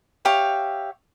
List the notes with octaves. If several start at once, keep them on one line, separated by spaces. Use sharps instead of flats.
G4 C#5 E5 F5